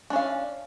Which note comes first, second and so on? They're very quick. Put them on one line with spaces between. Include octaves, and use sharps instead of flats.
D4 C#4 F5